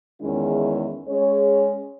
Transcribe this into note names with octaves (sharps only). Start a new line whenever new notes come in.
E2 D#3 G#3 C#4 E4
G#3 C#4 G#4 C#5